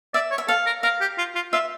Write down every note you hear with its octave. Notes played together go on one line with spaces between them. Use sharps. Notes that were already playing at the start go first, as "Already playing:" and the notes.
D5 E5
C#5
E5
A4 F5
A#4
A#4 F5
G4
F4
F4
F4 E5